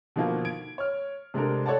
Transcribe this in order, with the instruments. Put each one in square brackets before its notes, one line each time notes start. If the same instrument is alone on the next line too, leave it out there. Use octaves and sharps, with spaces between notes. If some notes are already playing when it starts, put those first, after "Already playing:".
[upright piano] B2 D3 D#3 F3 A#3
G#6 D7
C#5 F6
C3 G#3 D4 A4 A#4
A4 C#5 D5 F#5 A5